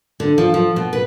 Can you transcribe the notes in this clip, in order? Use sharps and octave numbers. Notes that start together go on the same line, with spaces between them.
D3
F3
F3
B2
B4